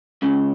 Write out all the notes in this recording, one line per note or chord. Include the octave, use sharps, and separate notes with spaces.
C#2 C#3